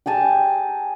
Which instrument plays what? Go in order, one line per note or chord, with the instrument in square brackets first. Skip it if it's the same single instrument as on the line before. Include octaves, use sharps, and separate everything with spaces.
[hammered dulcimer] G4 G#4 G#5 A5